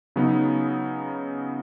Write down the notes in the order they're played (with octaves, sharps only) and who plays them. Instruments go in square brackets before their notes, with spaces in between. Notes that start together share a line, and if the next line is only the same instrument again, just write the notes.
[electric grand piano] C#3 F#3 B3 D#4